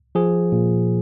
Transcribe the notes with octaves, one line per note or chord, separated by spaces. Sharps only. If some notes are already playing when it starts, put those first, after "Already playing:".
F3 G#4
A#2